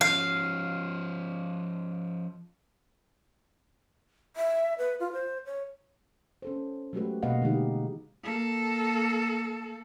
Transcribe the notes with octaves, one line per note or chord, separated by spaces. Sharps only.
F3 C#4 F5
E5
B4
F4
C5
C#5
C#4 A4 C5
F#3 G#3 A3 F#4 G4 B4
B2 A#3 B4 D#5 F5 F#5
D3 E3 G#3 D#4 G4
A#3 A4